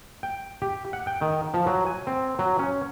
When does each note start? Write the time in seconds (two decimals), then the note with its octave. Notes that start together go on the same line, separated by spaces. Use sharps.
0.23 G5
0.62 G4
0.93 F#5
1.07 G5
1.21 D#3
1.54 F3
1.66 F#3
1.86 G#5
2.07 C4
2.39 F#3
2.59 C#4